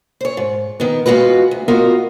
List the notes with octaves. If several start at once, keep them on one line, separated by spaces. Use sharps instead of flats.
C5 C#5
G#2
D#3 B3
G#3 B3 F4 F#4 B4
D2
B3 F4 F#4 A#4 D#5